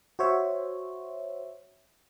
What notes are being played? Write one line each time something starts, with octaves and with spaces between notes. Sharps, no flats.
F#4 C5 C#5 E5